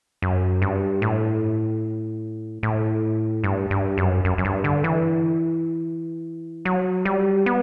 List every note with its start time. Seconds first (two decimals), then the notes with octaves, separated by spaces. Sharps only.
0.22 F#2
0.62 G2
1.02 A2
2.63 A2
3.44 G2
3.71 G2
3.98 F#2
4.25 F#2
4.38 F#2
4.45 G2
4.64 D3
4.84 E3
6.65 F#3
7.05 G3
7.46 B3